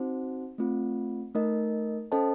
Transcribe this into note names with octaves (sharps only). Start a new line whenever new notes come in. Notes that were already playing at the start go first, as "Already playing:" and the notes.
Already playing: C4 D#4 F#4 C5
A3 C4 F4
A3 D#4 A#4 D#5
C#4 A4 C5 D#5 A5